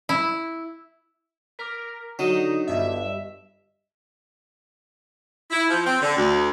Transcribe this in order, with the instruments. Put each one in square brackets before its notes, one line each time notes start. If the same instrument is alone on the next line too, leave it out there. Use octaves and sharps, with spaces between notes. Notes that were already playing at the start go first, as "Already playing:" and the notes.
[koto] E4
[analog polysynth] A#4 [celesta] D6 F6 B6
[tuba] D3 [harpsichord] F#3 [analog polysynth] D#4 [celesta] D#6 D#7 E7
[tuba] G1 [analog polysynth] G2 E5 [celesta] D#5
[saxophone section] E4
F3
C4
D3
D2